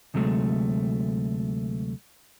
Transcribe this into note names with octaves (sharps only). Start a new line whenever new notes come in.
D2 C3 F#3 G#3 A3